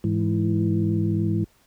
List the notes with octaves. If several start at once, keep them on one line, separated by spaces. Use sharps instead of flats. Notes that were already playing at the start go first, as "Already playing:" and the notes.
G#2 E3